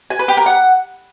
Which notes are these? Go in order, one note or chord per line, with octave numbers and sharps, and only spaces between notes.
G#5
B4
G4
A#4
F#5